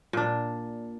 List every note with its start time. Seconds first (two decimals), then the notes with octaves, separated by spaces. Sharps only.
0.13 A#2 D4